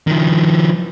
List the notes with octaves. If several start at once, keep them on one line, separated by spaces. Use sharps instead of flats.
D#3 F3